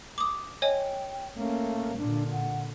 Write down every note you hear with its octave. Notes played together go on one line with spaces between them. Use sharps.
D6 D#6
C#5 D#5 G5 G#5
A3 A#3 C#4
A#2 D3 D4
F#5